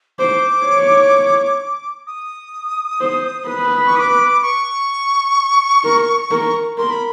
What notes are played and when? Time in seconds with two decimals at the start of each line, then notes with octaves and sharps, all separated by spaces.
0.19 C5 D6
0.65 C#5
2.07 D#6
3.01 C5
3.48 B4
3.86 C#6
3.96 D#6
3.99 D6
4.42 C#6
5.84 A#4
6.31 A#4
6.78 A#4 C6
6.90 B5